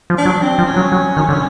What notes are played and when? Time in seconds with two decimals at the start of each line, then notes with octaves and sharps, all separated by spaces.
0.10 F3
0.18 D4
0.26 F#3
0.42 C4
0.58 F3
0.67 C#4
0.76 F#3
0.92 F#3
1.17 D#3
1.29 D3